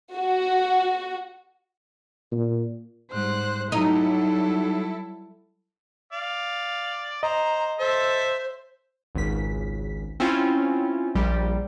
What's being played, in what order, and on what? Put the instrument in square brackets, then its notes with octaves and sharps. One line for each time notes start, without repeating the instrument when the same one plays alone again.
[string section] F#4
[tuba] A#2
[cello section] G#2 G3 [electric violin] C5 F#6
[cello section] F#3 G3 [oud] D#4 [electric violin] E4 A4
[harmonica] D5 F5
[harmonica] C5 [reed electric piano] D#5 [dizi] A#5
[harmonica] A4 E5 [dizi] C5
[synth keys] G#1 C#2 B6
C4 C#4 E4 F4
A#1 G3